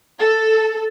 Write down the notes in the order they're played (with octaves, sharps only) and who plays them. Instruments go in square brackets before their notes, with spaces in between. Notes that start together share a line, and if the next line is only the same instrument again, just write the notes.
[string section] A4